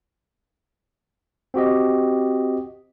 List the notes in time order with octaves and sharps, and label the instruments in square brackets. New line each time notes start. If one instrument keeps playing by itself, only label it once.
[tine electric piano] C4 F#4 G4 D#5